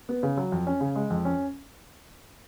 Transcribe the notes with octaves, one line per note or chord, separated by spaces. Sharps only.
B3
C#3
F#3
F2
C#4
C#3
G#3
F2
C#4